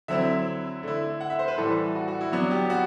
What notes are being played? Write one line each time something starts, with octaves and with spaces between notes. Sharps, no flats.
D3 F#3 C4 E4 E5
D3 A3 E4
F#5
E5
C5
B4
A2 E3 G3 A4
F#4
F#4
E4
F#3 B3 D4 F#4
G4
F#4